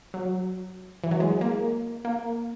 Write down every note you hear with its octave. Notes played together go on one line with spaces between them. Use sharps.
F#3
E3
F#3
G#3
A#3
A#3